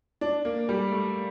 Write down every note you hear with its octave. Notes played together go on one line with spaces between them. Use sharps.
D4
A#3
G3
A3